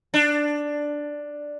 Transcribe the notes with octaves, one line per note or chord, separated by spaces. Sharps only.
D4